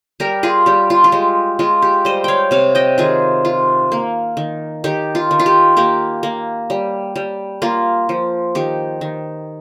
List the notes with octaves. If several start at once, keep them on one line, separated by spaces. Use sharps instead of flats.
G3 G4 A#4
F4 G#4
G3 G4
F4
F4
G#3 G4
G#3 F4
G4
G3 C5 D#5
C#5 F5 G5
C3 C#5 F5
D#5 G5
D#3 F4 G#4
F4
A#3
D#3
D#3 G4
F4
D#3
F4
G4
A#3 G4
A#3
G3
G3
A#3 F4
F3
D#3 G4
D#3